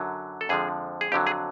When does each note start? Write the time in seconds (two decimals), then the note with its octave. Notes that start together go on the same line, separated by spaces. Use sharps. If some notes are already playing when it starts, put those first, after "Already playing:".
Already playing: F#2 D3 F#3
0.41 A4
0.49 F2 D3 F3 G#3 G#4
1.01 G#4
1.12 F2 D3 F#3 G4
1.27 G#4